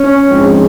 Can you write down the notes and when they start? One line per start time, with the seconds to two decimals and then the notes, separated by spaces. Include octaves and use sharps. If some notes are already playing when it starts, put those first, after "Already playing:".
Already playing: C#4
0.28 A#1 G#2 F3 G#3 C4